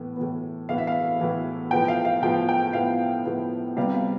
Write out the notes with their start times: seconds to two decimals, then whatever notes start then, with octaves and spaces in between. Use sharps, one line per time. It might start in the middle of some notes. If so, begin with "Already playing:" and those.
Already playing: A2 E3 B3
0.16 A2 E3 B3
0.69 A2 E3 B3 F5
0.78 E5
0.87 F5
1.19 A2 E3 B3
1.71 A2 F3 B3 G5
1.88 F5
2.05 F5
2.22 A2 F3 B3 G5
2.49 G5
2.73 A2 F3 B3 F5
3.25 A2 F3 B3
3.77 C3 G3 B3 F5
3.94 F5